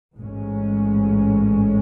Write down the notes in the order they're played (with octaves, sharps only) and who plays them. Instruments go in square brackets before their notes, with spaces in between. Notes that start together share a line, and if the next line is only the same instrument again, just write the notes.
[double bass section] A1 G#2 G#3 C#4